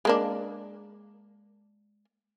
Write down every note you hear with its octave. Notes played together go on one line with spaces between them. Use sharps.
G#3 A#3 D4